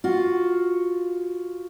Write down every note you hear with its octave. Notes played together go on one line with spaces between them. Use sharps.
F4 F#4